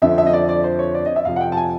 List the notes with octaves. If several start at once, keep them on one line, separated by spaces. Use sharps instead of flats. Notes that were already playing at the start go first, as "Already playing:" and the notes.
F2 D3 F3 E5
E5
D#5
D5
D5
C5
C#5
D5
D#5
E5
F2 C3 F3 F5
F#5
G5
A5
G#5